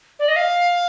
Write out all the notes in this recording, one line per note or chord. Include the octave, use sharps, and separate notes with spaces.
D5
D#5
F5